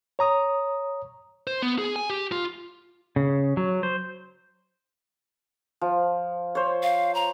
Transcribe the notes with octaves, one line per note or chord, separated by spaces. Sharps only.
C#5 A#5 D#6
C5
B3
G#4
G#5
G4
F4
C#3
F#3
C5
F3
C5 C#5
F5
A#5